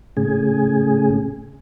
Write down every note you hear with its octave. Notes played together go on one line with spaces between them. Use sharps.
A2 C#3 G#4